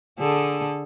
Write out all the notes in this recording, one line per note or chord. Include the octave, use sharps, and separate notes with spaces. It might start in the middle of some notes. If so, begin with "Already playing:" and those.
D3 G#4 A4